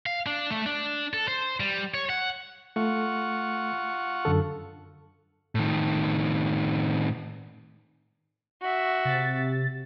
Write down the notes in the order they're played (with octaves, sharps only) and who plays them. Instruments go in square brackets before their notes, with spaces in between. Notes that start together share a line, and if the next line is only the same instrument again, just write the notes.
[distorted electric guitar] F5
D4
A3
D4
A4
C5
G3
C#5
F#5
[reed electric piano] A3 [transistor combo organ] F4 F#5 C#6
[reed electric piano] F#2 D3 A4
[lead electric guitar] A2 D#3
[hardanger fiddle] F#4 E5
[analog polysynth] C3 A6